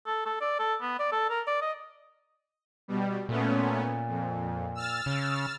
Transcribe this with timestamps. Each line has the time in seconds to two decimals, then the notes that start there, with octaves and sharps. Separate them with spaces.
0.06 A4
0.26 A4
0.41 D5
0.59 A4
0.81 B3
0.99 D5
1.12 A4
1.30 A#4
1.47 D5
1.61 D#5
2.88 B2 G3
3.29 A#2 A3 B3 C#4
4.08 F2
4.75 E6 F6 A6
5.06 C#3